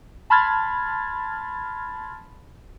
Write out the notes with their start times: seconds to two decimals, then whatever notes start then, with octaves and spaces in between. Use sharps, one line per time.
0.30 A5 B5 C6 F6 G#6 A6